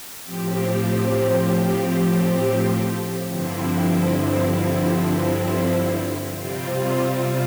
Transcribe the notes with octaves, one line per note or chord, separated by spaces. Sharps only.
A2 F3 C4 G4
G2 D3 F3 C4 E4
C3 G3 C4 F4